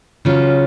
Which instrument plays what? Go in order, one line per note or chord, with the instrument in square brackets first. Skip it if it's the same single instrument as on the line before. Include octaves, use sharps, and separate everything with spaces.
[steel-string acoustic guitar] C#3 F#3 C#4 F4